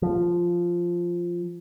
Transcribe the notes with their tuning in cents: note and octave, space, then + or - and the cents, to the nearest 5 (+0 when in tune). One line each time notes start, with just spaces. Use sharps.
F3 -5